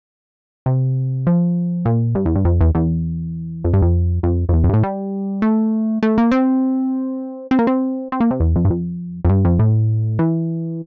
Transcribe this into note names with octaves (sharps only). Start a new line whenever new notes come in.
C3
F3
A#2
G2
E2
G2
F2
E2
E2
F2
G2
F2
F2
F2
E2
F2
G2
A2
G3
A3
A3
A#3
C4
C4
A#3
C4
C4
A#3
C3
E2
F2
G2
F2
F2
G2
F2
A2
E3